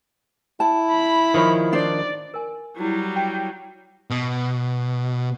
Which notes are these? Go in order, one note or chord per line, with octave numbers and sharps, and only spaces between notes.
E4 A5
B5
D#3 F3 C#5
D4 C5 D5
A#4 G#5
F#3 G3 E4 F4
G5
B2